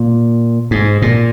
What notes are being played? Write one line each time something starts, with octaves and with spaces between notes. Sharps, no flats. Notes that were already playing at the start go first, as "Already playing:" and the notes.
Already playing: A#2
G#2
A#2